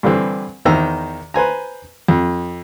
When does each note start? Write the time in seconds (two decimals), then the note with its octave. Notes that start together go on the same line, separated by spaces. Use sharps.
0.03 G2 D3 E3 C4
0.65 E2 D#3 C5 A#5 E6
1.34 B4 C5 G#5 A#5
2.08 F2